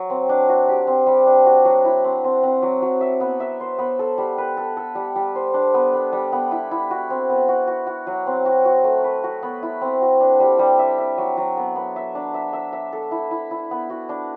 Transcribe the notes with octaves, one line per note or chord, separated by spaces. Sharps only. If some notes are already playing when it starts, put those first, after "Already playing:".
Already playing: F#3
C4
D4
F#4
G4
C4
G3
D4
F#4
F#3
E4
C4
C4
C4
F#3
F#3
E5
B3
E5
C5
B3
A4
G3
B4
A4
A4
G3
G3
C5
D4
B3
B3
G3
B3
E4
E4
F#4
C4
B3
F#4
F#4
F#4
F#3
C4
F#4
F#4
A3
B4
F#4
B3
E4
C4
F#4
D4
G3
G3
E5
E5
F#3
F#3
B3
B3
E5
D4
E5
E5
E5
A4
E4
E4
E4
B3
F#4
D4